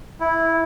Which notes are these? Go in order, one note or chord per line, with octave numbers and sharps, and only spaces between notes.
E4